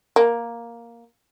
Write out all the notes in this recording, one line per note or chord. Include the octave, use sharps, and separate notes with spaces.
A#3